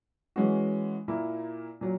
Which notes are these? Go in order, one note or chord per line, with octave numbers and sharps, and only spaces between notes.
E3 G#3 C#4 F#4
A#2 A#3 E4
A#2 F#3